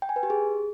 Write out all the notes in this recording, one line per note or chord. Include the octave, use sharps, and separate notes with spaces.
G5
G#5
B4
G4
G#4